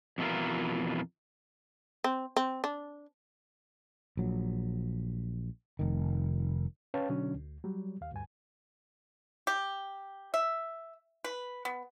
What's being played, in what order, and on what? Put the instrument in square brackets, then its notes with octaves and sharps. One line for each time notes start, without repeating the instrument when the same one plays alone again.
[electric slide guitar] F2 B2 E3 F4 A#4
[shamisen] C4
C4
D4
[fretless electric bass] A#1 F#3
F1 D#3
[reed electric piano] C#4 B4 C#5 F5 G5 A5
B2 D3 F#3 C#4 D4
D2
F#3 G3
D#2 F5
D2 G2 G#5
[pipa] G4
E5
B4
B3